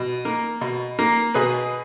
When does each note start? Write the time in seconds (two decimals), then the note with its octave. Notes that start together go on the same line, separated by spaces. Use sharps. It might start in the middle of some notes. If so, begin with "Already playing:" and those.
Already playing: B2
0.25 A#3
0.61 B2
0.99 A#3
1.34 B2 G#4 B4